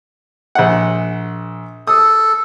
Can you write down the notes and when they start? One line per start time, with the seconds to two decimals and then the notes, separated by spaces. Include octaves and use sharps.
0.55 A#1 F#5
1.87 A4 D#6